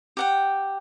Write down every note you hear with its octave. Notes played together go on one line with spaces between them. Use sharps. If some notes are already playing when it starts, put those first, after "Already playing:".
G4 F#5 G5